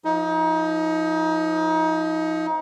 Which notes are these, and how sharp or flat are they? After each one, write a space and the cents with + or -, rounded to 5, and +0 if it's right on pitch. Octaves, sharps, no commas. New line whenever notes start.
F3 +0 D#4 +30